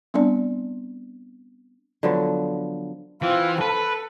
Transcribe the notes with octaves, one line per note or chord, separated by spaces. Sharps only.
G3 B3 C4 D4 D5
D3 F3 F#3 B3
E3 C4 F4
A4 B4